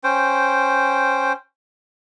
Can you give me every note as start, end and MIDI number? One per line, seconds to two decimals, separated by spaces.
0.04 1.33 61
0.04 1.33 72
0.04 1.33 79